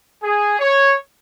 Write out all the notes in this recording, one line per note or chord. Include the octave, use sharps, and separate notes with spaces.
G#4
C#5